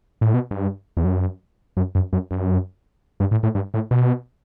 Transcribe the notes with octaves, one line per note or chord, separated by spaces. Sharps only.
A2
B2
G2
E2
F#2
F#2
F#2
F#2
F#2
G2
A2
A2
G2
A2
B2